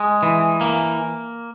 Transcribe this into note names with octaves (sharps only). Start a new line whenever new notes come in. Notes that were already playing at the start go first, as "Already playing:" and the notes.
Already playing: G#3
E3
A#3